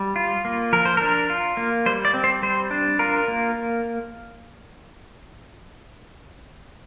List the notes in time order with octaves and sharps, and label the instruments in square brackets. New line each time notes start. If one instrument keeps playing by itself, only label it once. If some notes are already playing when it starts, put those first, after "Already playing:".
Already playing: [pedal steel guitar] G3
F4
A#3
F3 A#4
C5
D4 A#4
F4
A#3
G3 C5
D5
C4
C5
G3 C5
D4
F4 A#4
A#3